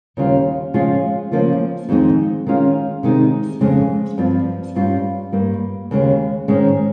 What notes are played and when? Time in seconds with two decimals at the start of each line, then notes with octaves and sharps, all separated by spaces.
0.17 D#2 C#3 G3 C#4 F4
0.73 C#3 F3 G#3 C#4 F4
1.32 C#3 F3 A#3 C#4 F4
1.89 F2 D#3 G#3 C4 D#4
2.47 D#3 G#3 C#4 F4
3.03 C3 D#3 G#3 D#4
3.61 F2 C#3 G#3 C4
4.18 G2 F3 C4 F4
4.75 G2 G3 C#4 F4
5.32 G2 G3 A#3
5.91 D#2 C#3 G#3
6.48 G#2 D#3 G#3 C#4